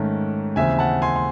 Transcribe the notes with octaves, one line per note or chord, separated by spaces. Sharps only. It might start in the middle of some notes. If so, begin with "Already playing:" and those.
Already playing: G#2 D#3 A3 C#4
D#2 C#3 E3 C4 E5 G#5
F#5 A5
G#5 C6
C6